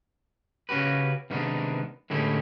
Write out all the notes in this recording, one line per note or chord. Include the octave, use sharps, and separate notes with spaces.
C#3 C#4 F#4 G4 B4
C3 D#3 G3 G#3 B3 D4
A2 D3 G#3 C#4 E4 G4